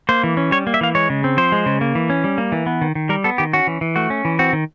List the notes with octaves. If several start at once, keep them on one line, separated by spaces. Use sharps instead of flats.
A#3 C5
E3
C#4
G3 C#5
A#3
E5
E3 F5
G#3 C#5
C#3
C4
F3 C5
G#3
C#3
A#3
E3
C#4
G3
A#3
E3
B3
D#3
D#3
G3 A#4
B3 A4
D#3 G4
C#4 F#4
E3
E3
A3 F#4
C#4
E3
C4 F#4
D#3